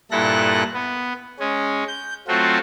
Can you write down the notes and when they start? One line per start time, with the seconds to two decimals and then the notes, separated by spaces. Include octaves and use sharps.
0.11 G2 A#2 E4 A4 F#6 A#6
0.74 B3
1.40 G#3 C#4
1.88 G6
2.28 F#3 A3 C4 F4 F#4